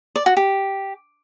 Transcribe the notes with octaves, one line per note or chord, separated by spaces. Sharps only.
D5
F#4
G4